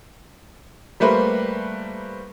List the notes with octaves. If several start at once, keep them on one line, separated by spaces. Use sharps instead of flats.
G3 A3 A#3 B4 C5